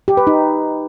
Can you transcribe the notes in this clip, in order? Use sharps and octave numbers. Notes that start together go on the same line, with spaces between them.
G4
B4
D#4